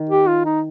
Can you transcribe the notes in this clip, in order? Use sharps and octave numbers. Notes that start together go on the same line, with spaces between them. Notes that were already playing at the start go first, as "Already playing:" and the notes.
Already playing: D#3
G4
F4
D#4